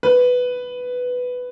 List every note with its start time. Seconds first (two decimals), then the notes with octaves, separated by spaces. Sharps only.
0.03 B4